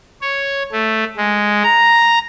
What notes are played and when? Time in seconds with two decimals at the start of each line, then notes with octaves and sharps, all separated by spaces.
0.21 C#5
0.72 A3
1.17 G#3
1.64 A#5